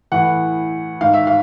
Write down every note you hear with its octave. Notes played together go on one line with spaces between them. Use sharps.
A2 E3 F#5
G#2 D#3 F5
E5
F5